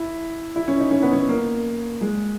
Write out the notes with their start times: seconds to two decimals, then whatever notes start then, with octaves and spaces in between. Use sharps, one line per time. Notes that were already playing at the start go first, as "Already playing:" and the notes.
Already playing: E4
0.56 E4
0.68 C#4
0.80 D#4
0.91 C#4
1.02 B3
1.13 C#4
1.29 A#3
2.01 G#3